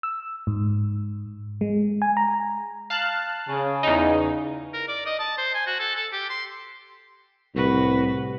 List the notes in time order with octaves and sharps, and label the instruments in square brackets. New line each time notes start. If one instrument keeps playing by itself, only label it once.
[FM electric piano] E6
G#2
G#3
G#5
A#5
[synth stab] F5 A5 F#6
[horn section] C#3
[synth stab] E2 D#4
[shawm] A#4
D5
D#5
A5
C5
G#5
F#4
A4
A4
G4
C6
[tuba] C2 [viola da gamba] A2 F#4 B4